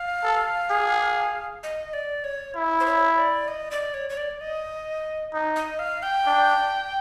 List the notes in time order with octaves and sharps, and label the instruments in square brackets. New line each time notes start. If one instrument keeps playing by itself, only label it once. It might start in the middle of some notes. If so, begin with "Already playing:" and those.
Already playing: [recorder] F5
[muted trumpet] A4
G#4
[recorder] D#5
D5
C#5
[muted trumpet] E4
[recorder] C5
C#5
D5
D#5
D5
C#5
C#5
D5
D#5
[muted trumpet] D#4
[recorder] D#5
F5
G5
[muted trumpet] D4